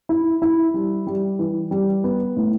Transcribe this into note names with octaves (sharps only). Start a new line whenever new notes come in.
E4
E4
G3
G3
E3
G3
B3
A2